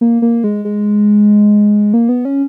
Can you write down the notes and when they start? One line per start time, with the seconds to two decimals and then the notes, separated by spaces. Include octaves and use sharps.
0.01 A#3
0.22 A#3
0.44 G#3
0.65 G#3
1.94 A#3
2.09 B3
2.25 C#4